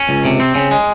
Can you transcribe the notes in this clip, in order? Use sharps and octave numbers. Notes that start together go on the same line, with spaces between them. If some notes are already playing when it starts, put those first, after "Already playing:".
Already playing: C#4
C#2
C3
C4
C#3
G#3